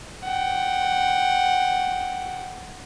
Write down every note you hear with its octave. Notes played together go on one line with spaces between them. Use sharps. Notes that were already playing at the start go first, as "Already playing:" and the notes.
F#5 G5